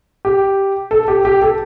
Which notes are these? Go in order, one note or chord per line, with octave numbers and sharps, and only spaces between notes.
G4
A4
G4
G4
A4